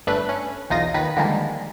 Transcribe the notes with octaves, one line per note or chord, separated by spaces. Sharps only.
G1 A3 D4 B4
C#4
B1 E2 D#4 F4 D#6 A#6
D#2 D#3 B4
D3 D#3 F3 G3 G#3 A#3